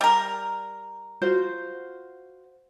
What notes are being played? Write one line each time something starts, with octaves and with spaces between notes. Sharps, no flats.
G3 A#4
F4 F#4 C5